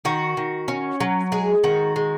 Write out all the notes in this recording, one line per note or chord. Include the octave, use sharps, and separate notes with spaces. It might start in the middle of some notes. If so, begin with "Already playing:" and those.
D#3 F#4
D#3
C#4
F#3
G#3 G#4
D#3 F#4
G#3